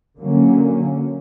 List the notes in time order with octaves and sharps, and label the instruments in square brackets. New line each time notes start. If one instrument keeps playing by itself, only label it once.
[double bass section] D3 F#3 A#3 C#4